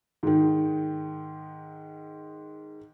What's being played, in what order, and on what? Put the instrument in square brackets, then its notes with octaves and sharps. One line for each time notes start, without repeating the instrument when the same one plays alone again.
[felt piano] G#2 D#3